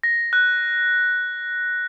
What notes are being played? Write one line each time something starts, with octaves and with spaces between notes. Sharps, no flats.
A#6
F#6